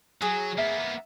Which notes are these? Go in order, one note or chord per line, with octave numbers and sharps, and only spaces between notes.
F#3 G#4
A#3 B3 E5